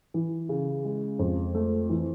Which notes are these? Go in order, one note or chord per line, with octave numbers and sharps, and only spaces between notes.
E3
C#3
G#3
F2
A3
E3